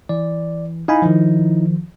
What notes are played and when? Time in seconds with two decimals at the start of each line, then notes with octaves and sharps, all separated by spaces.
0.09 E3 D5
0.88 D#4 E4 F5 G#5 B5
1.02 D#3 F3